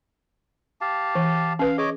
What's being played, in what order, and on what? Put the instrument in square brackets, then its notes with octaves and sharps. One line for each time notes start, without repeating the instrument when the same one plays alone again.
[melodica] G4 F5 A5
[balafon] E3
[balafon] C#4 B4 [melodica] F5
[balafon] G#4 [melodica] C#5 D#5 D6